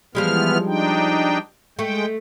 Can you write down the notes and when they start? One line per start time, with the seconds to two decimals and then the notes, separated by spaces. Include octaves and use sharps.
0.15 E3 F3 G3 G#3 B3 F6
0.66 D4 D#4 G5
1.79 G#3 A3 G5